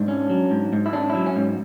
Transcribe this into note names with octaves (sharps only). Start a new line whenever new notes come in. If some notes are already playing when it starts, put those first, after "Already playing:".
Already playing: G#2 D4
C#4
F#3
G#2
G#2
E4
C#4 D4
F#3 E4
C#4
G#2